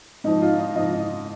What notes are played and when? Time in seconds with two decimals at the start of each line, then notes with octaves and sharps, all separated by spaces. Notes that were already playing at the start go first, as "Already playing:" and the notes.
0.24 G#2 F3 D#4
0.42 F4
0.59 D#5
0.76 G#2 F3 D#5